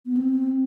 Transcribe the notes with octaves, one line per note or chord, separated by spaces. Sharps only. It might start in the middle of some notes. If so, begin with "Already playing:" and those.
B3
C4